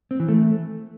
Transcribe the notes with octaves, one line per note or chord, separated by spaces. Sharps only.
C4
E3
A3